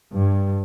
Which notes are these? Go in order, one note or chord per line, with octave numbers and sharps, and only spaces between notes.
G2